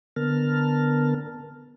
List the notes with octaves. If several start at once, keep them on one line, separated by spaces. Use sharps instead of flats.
D3 B3 A#4 A5 F6